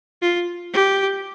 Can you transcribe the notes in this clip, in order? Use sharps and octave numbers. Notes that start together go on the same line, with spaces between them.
F4
G4